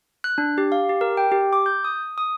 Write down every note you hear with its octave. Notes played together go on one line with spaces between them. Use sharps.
F#6
D4
G4
F5
G4
A#4
G5
G4
D6
G6
D#6
D#6